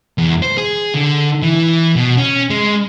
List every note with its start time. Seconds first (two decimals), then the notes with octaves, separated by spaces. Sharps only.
0.18 E2
0.42 C5
0.58 G#4
0.95 D3
1.42 E3
1.96 B2
2.17 C#4
2.50 G#3